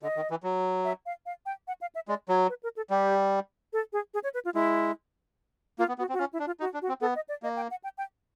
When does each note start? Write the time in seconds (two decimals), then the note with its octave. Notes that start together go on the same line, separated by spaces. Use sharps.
0.03 D3 D#5
0.16 D#3
0.30 E3
0.43 F#3
0.84 E5
1.06 F5
1.26 F5
1.46 G5
1.68 F#5
1.81 F5
1.95 E5
2.08 G#3 D5
2.28 F#3 C#5
2.49 B4
2.63 A#4
2.76 A4
2.90 G3 G4
3.73 A4
3.93 G#4
4.14 G#4
4.23 C#5
4.34 B4
4.45 F4
4.54 G#3 E4
5.79 A#3 F4
5.88 B3
5.98 B3 F#4
6.09 C4
6.13 F#4
6.19 C#4 F4
6.33 E4
6.39 D4
6.46 F4
6.60 D#4 F#4
6.74 D4
6.82 F#4
6.88 C4
7.01 B3 A4
7.15 D#5
7.29 D5
7.43 A#3 D#5
7.56 G5
7.71 F#5
7.84 G5
7.98 G5